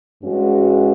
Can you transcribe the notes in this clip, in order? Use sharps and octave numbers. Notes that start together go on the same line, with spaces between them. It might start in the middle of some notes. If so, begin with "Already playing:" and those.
G2 E3 G#3 C#4 F#4